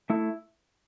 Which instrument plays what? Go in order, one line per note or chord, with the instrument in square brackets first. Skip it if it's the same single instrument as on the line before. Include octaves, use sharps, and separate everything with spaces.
[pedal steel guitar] A3 E4